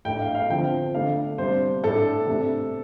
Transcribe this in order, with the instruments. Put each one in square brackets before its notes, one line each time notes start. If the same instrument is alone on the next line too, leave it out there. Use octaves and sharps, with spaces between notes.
[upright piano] A2 A3 D4 G5
F5
F5
D3 F3 C4 G5
D3 A3 D4 F5
C3 G3 D4 C5
A2 A3 D4 A4
C3 A3 D4